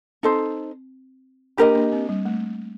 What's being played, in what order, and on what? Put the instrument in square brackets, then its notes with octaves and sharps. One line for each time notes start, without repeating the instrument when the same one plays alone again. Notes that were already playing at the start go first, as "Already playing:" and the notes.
[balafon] C4 [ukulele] D#4 A4 C5
[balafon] A#3 D4 [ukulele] G4 A#4 D#5
[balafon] A#3 D4
C4
G3
A3